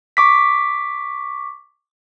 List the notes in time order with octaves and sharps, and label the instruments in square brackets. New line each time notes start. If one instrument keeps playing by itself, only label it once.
[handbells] C#6 D6 B6